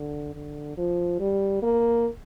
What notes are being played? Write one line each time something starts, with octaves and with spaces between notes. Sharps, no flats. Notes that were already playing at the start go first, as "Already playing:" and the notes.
Already playing: D3
D3
F3
G3
A#3